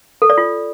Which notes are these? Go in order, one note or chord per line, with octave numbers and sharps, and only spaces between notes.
A4
D5
F4